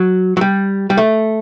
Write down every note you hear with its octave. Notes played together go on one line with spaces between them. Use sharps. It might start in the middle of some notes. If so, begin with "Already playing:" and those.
Already playing: F#3
F#3
G3
G3
A3